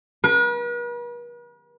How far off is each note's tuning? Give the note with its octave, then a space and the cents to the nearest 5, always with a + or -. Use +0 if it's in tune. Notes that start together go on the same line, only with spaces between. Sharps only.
B4 -45